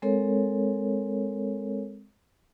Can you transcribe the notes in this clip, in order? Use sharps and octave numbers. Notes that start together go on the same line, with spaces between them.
G#3 C4 A4 A#4 C#5